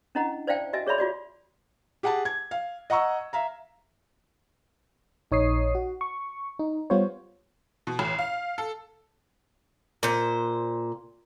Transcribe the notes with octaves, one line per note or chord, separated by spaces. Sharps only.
C#4 D4 E4 D#5 F#5 A#5
C5 D5 E5 F5 G5 A5
F#4 D#5 E5 G#5
G#4 C#5 D5 E5 B5 C6
F4 F#4 D5
G4 G#4 F#5 G#5 A5
G#6
F5
D#5 F#5 A#5 C#6 E6
E5 F5 A#5
A#1 D#4 C#5 D#6 C7
F#4
C#6
D#4
G3 B3 F4 C5 C#5
B2
A1
F5
A4
A#2 C5